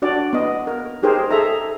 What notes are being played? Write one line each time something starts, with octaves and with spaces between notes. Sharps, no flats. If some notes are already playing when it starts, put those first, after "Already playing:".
D4 F#4 D5
B3 D#5
A#4
D#4 G4 G#4 A#4 C5
G#4 A4 E5 A#5